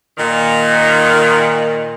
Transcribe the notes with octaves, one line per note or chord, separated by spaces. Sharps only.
A#2 D#3